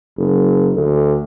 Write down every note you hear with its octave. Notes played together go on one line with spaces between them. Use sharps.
F#1
D2